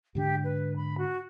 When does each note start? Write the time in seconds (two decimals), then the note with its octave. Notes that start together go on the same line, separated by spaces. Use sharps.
0.15 G#2 D3 D4 G4
0.44 B4
0.76 B5
0.97 F#4